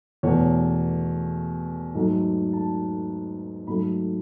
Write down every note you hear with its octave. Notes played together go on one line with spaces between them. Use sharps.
E2 B2 A3 C#5
G#2 F#3 A3 A4
A5
G#2 F#3 A3 B5